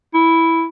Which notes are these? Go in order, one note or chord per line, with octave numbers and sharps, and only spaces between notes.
E4